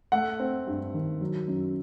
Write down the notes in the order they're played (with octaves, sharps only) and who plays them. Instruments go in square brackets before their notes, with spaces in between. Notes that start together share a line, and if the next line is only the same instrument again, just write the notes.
[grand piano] A3 F#5
C4
G2
D#3
F#3
F#2